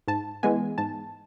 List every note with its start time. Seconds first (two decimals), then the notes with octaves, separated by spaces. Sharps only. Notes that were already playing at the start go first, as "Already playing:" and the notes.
0.08 G#2 A5
0.43 E3 G#3 B3 G#5
0.78 G#2 A5